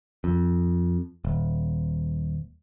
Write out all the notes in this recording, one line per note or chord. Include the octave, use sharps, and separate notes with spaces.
F2
D#1